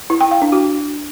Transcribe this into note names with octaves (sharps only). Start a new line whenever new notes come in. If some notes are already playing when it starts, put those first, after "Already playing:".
E4
G5
F5
D4
F#4